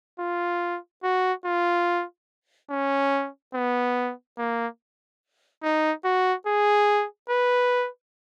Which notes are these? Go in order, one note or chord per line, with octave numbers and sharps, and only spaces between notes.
F4
F#4
F4
C#4
B3
A#3
D#4
F#4
G#4
B4